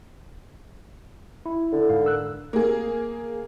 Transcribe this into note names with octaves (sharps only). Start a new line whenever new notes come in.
E4
D3
G#2 F5
A#4 E6 F#6
A#3 G#4